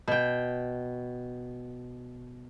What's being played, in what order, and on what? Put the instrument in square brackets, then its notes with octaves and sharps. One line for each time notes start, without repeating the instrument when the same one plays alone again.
[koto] B2 G5